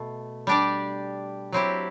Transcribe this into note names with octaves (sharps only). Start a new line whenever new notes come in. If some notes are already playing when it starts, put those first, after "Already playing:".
Already playing: B2 A3
G3 D4 G4 D5
F#3 C4 E4 G4